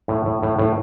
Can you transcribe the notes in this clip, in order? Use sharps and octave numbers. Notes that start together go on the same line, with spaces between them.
A2
A2
A2
A2